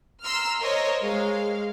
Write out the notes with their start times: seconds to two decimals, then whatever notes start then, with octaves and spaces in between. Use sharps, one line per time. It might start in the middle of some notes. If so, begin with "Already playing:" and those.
0.24 A#5 C6 E6 F6
0.60 A#4 C5 C#5 D#5
1.02 G#3 F5